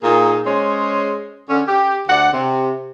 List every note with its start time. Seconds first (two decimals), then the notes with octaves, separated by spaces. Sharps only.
0.02 A#2 A#3 D#4 G#4
0.45 G#3 C#4 G#4 C5 C#5
1.49 D3 C#4
1.67 G4
2.08 D2 A3 D5 F#5
2.33 C3